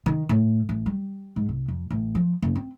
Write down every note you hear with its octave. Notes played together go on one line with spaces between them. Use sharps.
D#3
A2
A1
G3
G#2
C2
F2
A1
F3
F#1
C4